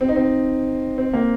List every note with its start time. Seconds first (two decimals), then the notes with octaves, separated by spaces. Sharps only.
0.01 C4
0.08 D#4
0.16 C4
0.98 C4
1.13 A#3